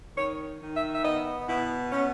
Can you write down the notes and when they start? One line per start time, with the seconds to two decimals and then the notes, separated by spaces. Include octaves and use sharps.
0.15 D#3 C#5
0.59 D#3
0.74 E5
0.92 E5
1.04 B3 D#5
1.47 B2 E4
1.91 B2 C#4